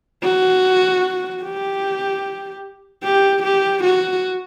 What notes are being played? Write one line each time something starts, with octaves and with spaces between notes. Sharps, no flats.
F#4
G4
G4
G4
F#4